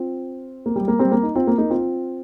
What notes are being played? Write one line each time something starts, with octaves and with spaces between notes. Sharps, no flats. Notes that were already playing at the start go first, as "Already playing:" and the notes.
Already playing: C4 F4
A#3
G3
A#3
G3 C4
A#3
D#4
C4 F4
A#3
A#3 D#4
C4 F4